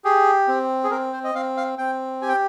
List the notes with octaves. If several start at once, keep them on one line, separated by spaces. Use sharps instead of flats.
G4 G#4
C4
G#4
C4 A#4
C5
D#5
C4 F5
F5
C4 G5
G4 G#5
G5